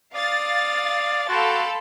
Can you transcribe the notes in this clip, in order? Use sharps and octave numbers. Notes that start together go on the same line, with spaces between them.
D5 F5 D#6 A6
F#4 A4 F5 G5 B5 C6